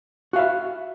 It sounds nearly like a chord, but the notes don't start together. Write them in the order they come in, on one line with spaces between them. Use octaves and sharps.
F#4 F5 E5